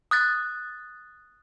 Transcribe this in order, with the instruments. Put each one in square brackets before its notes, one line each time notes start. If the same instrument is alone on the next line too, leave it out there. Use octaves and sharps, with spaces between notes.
[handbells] D#6 F#6 A6